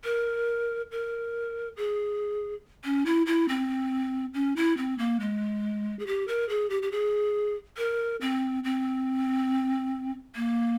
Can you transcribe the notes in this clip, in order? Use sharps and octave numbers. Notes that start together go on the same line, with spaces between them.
A#4
A#4
G#4
C#4
E4
E4
C4
C#4
E4
C4
A#3
G#3
G#4
G4
A#4
G#4
G4
G4
G#4
A#4
C4
C4
A#3